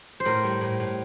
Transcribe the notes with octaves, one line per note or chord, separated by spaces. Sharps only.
C5
A2 A#4
G3
A2
A2